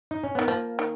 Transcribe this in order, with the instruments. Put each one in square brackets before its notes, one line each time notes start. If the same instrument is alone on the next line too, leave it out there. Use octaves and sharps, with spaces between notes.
[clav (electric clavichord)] D#4
C#4
[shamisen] D#3 [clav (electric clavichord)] B3
[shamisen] F3 [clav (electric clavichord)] A#3
[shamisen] D#3